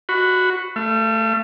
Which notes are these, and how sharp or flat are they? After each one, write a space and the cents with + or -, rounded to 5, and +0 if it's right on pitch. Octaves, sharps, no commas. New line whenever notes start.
F#4 -5 B5 +20
A3 +5 F5 -45